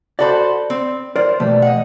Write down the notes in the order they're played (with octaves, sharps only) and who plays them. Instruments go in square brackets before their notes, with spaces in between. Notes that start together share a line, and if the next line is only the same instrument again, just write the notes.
[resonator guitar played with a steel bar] F#4 A4 C5 [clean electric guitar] D5 B5
[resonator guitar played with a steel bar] C4
[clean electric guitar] A#4 D5 [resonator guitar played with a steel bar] C5
[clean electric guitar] B2 E3 A3 [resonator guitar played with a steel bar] G3
[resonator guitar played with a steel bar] D#5 F#5